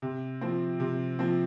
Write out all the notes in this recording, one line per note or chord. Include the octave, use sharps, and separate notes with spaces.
C3
F3 C4
C3
F3 C4